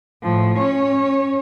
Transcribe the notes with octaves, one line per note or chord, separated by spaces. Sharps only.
A2 F3
C#4 C#5